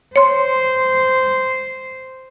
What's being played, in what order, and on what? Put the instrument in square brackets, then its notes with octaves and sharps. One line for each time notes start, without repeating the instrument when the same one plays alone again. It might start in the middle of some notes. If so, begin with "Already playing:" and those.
[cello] C5 [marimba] C#5 C6